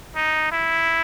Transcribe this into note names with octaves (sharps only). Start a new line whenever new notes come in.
D#4
E4